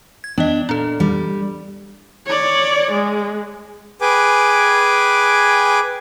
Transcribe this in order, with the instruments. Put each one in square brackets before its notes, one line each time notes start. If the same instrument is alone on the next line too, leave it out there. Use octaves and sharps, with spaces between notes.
[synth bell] G#6
[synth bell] B3 D#5 [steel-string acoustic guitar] D4
[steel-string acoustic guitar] A#2 [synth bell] D4 A4
[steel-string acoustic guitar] G3
[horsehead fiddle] C#5 D5
G#3
[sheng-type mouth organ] G#4 B4 G5 G#5 D6